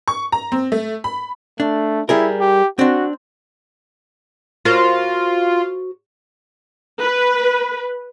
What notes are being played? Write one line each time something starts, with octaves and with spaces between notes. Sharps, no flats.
C#6
A#5
C4
A3
B5
A3 D4
G3 E4 G#4 A#4
G4
C4 D4 F#4
F4 F#4 A#4 C5
B4